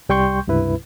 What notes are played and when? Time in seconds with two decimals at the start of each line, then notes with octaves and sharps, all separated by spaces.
0.09 C2 G3 G5 C6 C#6 G6
0.47 C#2 G2 C3 E4 B4